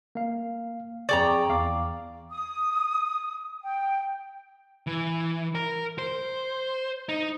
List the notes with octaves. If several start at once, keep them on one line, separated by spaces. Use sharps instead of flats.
A#3 F5
F2 G#4 D5 G5 A#5 C#6
E2 F5 D6
D#6
G5
E3
A#4
C5
D#4